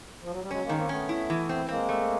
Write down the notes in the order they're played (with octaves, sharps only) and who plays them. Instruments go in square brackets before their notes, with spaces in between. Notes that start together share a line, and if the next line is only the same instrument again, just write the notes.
[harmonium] F3
F#3
G3
[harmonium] F#3 G#3 [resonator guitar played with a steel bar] C#4
[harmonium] G#3 A#3
[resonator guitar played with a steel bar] D#3
[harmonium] A#3 C4
[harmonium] A3 B3 [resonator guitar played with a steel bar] C#4
[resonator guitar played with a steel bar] E4
E3
C4
[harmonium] G#3 A#3 [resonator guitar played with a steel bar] C4
[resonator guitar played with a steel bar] A3